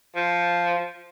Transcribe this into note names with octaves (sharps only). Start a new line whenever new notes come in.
F3